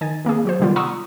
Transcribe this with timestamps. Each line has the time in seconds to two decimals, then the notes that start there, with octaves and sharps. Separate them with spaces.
0.01 D#3 G#5 A6
0.25 D#3 A#3 C4 G#4
0.45 F#3 F#4 C5
0.60 C3 D#3 G3 B3 F4
0.76 F#5 A#5 C6 C#6 D#6 E6